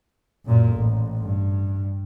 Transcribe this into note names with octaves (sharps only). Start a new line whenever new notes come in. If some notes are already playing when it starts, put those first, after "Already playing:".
F#2 A#2
A1
G2